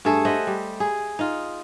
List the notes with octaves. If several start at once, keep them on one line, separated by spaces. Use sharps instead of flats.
G2 A3 G#4 A4
C5 D#5 E5 F#5
G3
G#4
D#4 F4